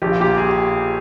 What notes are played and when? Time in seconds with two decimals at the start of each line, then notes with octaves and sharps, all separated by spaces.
0.02 A#1 G4
0.11 F4
0.20 A#2 G4
0.37 G#4